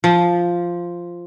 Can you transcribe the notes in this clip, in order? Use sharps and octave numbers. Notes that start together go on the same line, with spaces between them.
F3